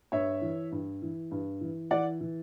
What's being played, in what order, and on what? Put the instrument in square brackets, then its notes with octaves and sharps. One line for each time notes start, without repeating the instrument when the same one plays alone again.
[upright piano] G2 C#5 E5
E3
G2
E3
G2
E3
E3 D5 F#5
E3